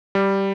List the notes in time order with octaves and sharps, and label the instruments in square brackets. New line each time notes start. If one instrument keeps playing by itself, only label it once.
[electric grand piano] G3